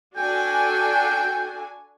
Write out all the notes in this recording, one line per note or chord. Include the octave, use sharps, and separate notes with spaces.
D4 F#4 A4 G5 G#5